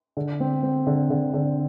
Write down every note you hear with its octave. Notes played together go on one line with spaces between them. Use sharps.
D3
C4
C4
D3
D3
D3